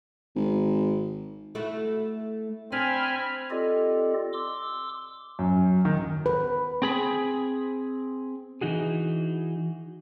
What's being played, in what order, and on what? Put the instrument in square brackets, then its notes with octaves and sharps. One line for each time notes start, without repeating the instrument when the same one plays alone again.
[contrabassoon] G#1
[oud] A3 E4 F#4
[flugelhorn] C4 [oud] D4 [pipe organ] G#5 B5 F6
[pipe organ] C4 F4 G4 A4 D5 D#5
C6 D6 E6
[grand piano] F#2
D#3
[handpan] B4
[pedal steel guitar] C4 G#4 B5
[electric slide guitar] E3 D#4 F#4 G#4